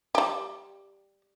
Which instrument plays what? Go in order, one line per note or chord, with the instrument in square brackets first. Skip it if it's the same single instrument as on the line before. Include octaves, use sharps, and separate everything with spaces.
[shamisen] G3 G4